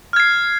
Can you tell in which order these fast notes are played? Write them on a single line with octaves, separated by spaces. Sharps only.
F6 G#6 C7